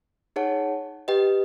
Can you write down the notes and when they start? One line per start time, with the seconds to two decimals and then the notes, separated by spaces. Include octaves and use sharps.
0.36 D#4 G#4 C#5 F#5 A5
1.08 G4 B4 D#5 G5